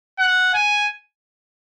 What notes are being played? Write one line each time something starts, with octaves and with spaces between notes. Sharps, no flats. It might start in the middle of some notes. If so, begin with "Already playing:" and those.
F#5
G#5